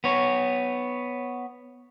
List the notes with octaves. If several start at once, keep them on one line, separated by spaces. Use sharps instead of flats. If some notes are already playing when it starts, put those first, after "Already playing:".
B3 C#5